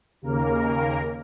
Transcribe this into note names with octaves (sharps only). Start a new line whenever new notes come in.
D#2 C#3 A#3 A#4